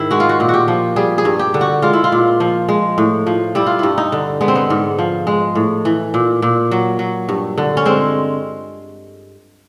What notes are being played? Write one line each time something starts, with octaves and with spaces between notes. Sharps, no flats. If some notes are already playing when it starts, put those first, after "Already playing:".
Already playing: G#2 D#3 E4
G#3 F#4
F4
F#4
A#2
F#4 G4
F3
G3 G#4
G#4
G2
G4
D3
F#4
G#3 F4
E4
F4
A#2
F3
G#3
A2
F3
G3 E4
F4
G2 E4
D#4
D3
G#3 B3
C4
B3
G#2
F3
G#3
A2
E3
A#2
A#2
F#3
F#3
G2
D3
C#4
G#3 C4